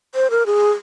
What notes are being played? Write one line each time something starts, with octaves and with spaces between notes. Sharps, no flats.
C5
A#4
G#4